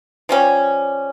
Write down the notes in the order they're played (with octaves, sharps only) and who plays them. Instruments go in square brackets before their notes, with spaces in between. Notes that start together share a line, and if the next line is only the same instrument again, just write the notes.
[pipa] F3 G3 C#4